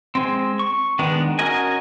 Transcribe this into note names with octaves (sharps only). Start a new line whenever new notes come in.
G#3 C4
C#6
D#3 G#3 B3 D4
C#4 F#4 A#4 D#5 G#5